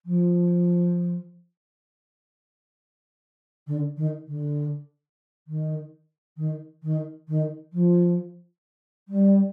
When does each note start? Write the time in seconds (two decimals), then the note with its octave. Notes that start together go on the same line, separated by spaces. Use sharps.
0.05 F3
3.67 D3
3.97 D#3
4.27 D3
5.47 D#3
6.37 D#3
6.83 D#3
7.28 D#3
7.73 F3
9.08 G3